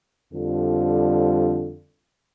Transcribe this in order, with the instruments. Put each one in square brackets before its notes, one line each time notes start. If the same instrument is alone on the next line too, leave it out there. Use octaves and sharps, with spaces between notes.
[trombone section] F2 D3 F3 G3